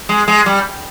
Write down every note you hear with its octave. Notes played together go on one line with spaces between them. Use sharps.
G#3
G#3
G3